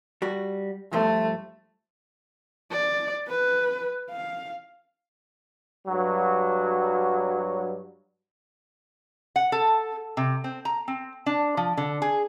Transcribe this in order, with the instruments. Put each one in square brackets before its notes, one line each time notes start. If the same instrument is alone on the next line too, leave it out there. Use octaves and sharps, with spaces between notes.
[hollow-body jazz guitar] G3 F#4
[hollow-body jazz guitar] G2 F3 C5 [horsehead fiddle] A3
[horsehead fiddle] D5
B4
F5
[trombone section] G2 F#3
[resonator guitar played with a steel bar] F#5
A4
C3
C4
A#5
C4
D4
F3
D3
G#4